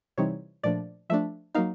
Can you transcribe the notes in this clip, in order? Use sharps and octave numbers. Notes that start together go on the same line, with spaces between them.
C3 E3 G3 C4 D#4 C#5
A#2 F3 A3 D4 D5
F3 A3 D4 E5
F#3 A#3 D#4 F5